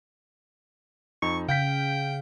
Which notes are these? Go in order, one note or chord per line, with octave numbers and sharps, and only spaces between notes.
F2 D#4 C#6
C#3 F5 G5 G6 B6